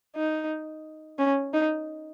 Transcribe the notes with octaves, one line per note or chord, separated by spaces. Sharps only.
D#4
C#4
D#4